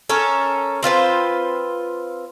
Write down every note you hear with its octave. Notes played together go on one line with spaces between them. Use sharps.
C#4 A4 A#4 C#5
C4 F4 B4 C5